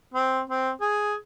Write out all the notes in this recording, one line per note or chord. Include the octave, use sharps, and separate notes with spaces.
C4
C4
G#4